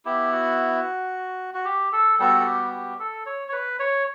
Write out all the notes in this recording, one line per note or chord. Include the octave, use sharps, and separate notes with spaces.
B3 E4 G4
F#4
F#4
G4
A4
G3 B3 F#4 A4
A4
G4
G4
A4
C#5
C#5
B4
C#5